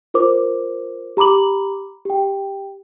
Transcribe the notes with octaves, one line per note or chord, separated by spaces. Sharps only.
F4 A#4 C5 D6
G4 A#5 B5 D6 F#7
G4 G5